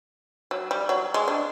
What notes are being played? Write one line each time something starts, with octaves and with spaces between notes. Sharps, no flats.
F#3
G3
F#3
G#3
D4